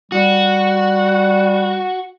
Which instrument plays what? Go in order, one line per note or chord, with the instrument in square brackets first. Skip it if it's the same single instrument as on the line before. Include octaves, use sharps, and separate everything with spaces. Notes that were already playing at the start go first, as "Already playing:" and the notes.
[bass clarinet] G3 [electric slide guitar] F#4